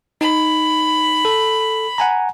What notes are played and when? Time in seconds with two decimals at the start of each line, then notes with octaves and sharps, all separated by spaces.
0.21 D#4 B5
1.25 A4
1.98 F#5 G#5 A#5